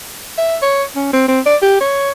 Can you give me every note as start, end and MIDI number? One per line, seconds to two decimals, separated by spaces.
0.38 0.57 76
0.62 0.83 73
0.96 1.09 61
1.13 1.24 60
1.28 1.40 60
1.46 1.56 74
1.62 1.79 67
1.81 2.11 73